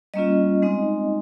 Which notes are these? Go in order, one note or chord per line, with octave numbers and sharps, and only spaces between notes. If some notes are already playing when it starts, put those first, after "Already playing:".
G3 A#3 C#4 F4 D#5
G#3 C4 D#4